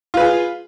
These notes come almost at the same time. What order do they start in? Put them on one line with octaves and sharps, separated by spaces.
F4 B4 G#4